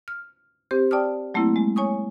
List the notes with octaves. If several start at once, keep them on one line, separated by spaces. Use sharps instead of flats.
F6
C4 G4 C5
D5 G5 A5 D6 D#6 F6
F#3 A3 A#3 C4 E4
G#3
C#5 G#5 C#6 D#6